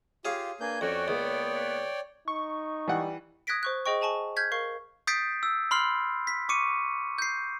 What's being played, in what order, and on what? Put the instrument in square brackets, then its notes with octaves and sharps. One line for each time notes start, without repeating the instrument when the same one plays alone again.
[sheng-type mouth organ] F4 G4 [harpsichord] G#4 C#5 F5
[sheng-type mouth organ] A#3 G6 [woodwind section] D4 B4 G#5
[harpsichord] F2 [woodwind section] C#4 F#4 [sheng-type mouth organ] C#5 D5 G5
[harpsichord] C#2 [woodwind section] A#3 B3
[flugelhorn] D#4 [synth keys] C#6
[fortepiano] E3 F#5 [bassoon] G3
[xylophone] D#6 F#6 G#6 A#6 B6 D7
C5 C#6 F#6
G#4 C5 D#5 G5 C#6
G#4 G#5 A5 C#6 F#7
F6 G6 G#6 B6
A#4 F5 C#6 C7
[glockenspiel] D#6 G6 A6 B6 C7 D7
E6
B5 C6 F6 C7
B6
C#6 D6 C#7 D#7
G6 C7